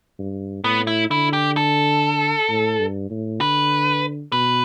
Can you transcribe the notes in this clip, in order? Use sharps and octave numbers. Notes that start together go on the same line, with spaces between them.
G2
A2 B3
E4
D3 E4
G4
A4
A2
G2
A2
D3 B4
B2 B4